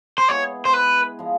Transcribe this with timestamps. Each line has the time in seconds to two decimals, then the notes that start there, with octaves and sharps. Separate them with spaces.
0.18 C5
0.29 G#3 B3 E4 G#4 C#5
0.65 C5
0.74 B4
1.19 F3 G#3